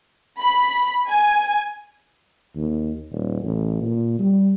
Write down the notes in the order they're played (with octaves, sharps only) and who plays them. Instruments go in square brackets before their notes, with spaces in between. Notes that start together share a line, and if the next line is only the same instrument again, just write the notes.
[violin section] B5
G#5
[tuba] D#2
D#1
A1
A#2
G3